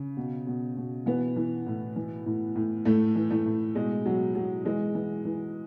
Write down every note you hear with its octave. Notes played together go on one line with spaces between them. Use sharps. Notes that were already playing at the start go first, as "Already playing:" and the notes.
Already playing: C#3
B2
B2
B2
B2 E3 B3
E3
A2
E3
A2
A2
A2 A3
E3
A2 A3
A2
B2 G#3
B2 F#3
B2 F#3
E3 G#3
E3
E3